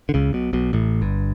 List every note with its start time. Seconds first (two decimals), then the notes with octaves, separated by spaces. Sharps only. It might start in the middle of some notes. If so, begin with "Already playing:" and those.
0.09 D3
0.14 C#2 C#3
0.33 B1 B2
0.53 B1 B2
0.73 A1 A2
1.01 G1 G2